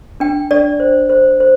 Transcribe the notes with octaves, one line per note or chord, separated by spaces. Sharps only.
D4 G5
D4 D5
C5
C5
C5